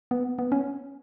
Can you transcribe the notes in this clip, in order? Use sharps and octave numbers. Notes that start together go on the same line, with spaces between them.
B3
B3
C#4